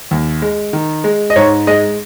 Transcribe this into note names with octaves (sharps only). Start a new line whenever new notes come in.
D#2
G#3
D#3
G#3
D#5
G#2 C#5
G#3 D#5